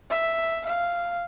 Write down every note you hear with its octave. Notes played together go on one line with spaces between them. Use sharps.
E5
F5